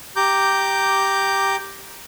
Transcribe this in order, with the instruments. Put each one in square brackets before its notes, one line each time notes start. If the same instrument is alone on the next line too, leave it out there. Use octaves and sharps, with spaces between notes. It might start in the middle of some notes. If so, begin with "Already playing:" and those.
[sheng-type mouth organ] G4 A#5 D6 G6